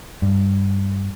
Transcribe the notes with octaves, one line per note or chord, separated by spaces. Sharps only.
G2